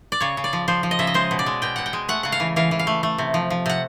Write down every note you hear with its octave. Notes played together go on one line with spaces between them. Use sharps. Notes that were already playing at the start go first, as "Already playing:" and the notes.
D5
C#3 C#5
C#3
D5
F3
F3 C5
F3
D#5
C#3 E5
D#5
G#3 C5
B2
D5
G#3
B2 G5
B2 F#5
G5
G#3
A3 F#5
C#3 F#5
F5
E3
E3 F5
E3
F5
A3
A3
C3
F3
F3
C3 F#5